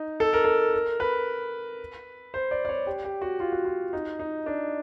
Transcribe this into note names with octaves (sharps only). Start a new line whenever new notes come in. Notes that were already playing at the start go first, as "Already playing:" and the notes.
Already playing: D#4
A4
A#4
A4
A#4
B4
C5
D5
D5
C#5
G4
G4
F#4
F4
F#4
F4
D#4
D#4
D4